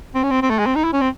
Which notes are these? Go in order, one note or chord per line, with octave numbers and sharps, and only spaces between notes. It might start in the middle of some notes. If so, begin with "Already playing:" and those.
C4
C#4
C4
C4
A3
G#3
C4
D#4
E4
C#4
C4